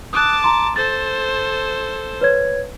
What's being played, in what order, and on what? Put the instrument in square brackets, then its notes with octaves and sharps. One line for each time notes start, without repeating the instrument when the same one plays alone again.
[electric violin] A5 D6 [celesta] D#6 F#6
[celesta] A#5 C6
[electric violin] A4 C5 [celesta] A6
[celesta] B4 C#5 G#6